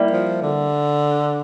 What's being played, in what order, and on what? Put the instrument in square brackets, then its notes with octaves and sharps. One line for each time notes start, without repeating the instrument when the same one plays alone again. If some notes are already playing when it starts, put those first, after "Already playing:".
Already playing: [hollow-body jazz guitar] G3 A#3 E4
[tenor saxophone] F3
D3